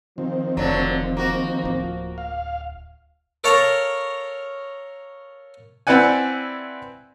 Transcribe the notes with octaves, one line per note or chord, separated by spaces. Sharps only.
D#3 F3 C4
F1 D3 F#3
A#3 F#4
D1 F4
F5
A4 A#4 C#5 F5 A5 A#5
C4 E4 B4 D5 F#5 G#5